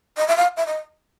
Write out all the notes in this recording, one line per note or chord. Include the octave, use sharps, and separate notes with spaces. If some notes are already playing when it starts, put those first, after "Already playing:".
D#5
E5
F5
E5
D#5